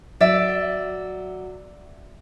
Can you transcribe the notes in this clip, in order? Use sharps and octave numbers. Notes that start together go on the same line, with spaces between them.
F#3 D5 E5